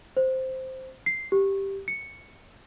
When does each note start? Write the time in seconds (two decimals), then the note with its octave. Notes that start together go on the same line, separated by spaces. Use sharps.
0.17 C5
1.06 C7
1.32 G4
1.88 C#7